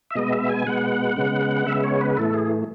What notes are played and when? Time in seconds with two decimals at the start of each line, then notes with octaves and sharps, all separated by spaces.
0.11 E5
0.15 B2 G#3 B3 D#5
0.32 E5
0.49 G#5
0.67 B2 G#3 B3 F#5
1.17 C#3 G#3 B3
1.66 C#3 G#3 B3 E5
1.84 C#5
2.01 B4
2.17 A2 E3 A3 A4
2.34 G#4